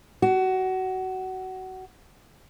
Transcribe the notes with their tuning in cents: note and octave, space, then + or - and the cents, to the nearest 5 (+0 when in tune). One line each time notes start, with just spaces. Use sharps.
F#4 +20